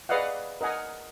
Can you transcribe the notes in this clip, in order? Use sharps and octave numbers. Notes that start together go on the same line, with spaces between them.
G#4 B4 D5 D#5 F5 F#5
A#4 D#5 F#5 G#5 D#6